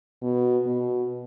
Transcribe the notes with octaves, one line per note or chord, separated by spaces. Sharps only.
B2
B2